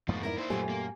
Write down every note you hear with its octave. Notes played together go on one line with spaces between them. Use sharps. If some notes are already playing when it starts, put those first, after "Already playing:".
F2 G#2 F3 A3 B3
D#4 E4 A#4 D5
A#3 C5
F#2 A#2 A3 F4 G4 G#5
A#3